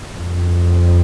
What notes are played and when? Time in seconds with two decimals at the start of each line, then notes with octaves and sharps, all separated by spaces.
0.13 F2